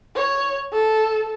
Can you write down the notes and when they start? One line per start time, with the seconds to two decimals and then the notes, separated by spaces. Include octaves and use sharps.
0.16 C#5
0.73 A4